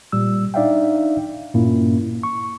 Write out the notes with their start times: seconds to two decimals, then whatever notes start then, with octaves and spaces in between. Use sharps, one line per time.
0.12 A#2 G3 E6
0.54 D4 D#4 D5 E5 F5 G5
1.55 G2 A#2 A#3 C#4 E4
2.23 C#6